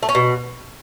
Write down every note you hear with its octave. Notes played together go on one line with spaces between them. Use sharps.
A3
C#4
B2